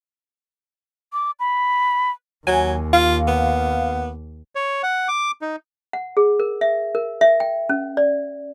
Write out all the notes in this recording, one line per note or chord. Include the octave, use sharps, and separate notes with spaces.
D6
B5
D#2 F#3 G#5
F4 F5
B3
C#5
F#5
D6
D#4
F#5
G#4
A#4
E5
A#4
E5
G5
C#4
D5